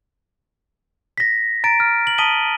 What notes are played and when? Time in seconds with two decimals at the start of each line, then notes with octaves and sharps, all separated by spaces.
1.18 A#6 B6
1.64 A#5 A6 D7
1.80 F6
2.07 F#7
2.18 A5 D#6 B6 D#7 F#7 G7